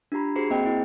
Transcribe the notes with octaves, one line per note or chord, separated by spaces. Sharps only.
D4 F4 G4 A#5 B5
F#4 G#4 C5 C7
A#3 C4 G#4 C5 D#5 G5
E4